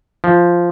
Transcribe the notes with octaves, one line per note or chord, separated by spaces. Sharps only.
F3